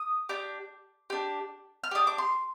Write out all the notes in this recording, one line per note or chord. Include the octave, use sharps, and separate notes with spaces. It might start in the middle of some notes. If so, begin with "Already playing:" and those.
Already playing: D#6
D4 G4 D6
D4 G4
F6
D4 G4 D#6
D6
C6